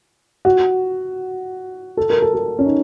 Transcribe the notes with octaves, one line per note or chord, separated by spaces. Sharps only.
F#4
A4
A#4
A4
A4
C#4
D#4